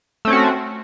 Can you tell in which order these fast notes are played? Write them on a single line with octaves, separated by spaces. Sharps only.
A3 C4 C#4 F#4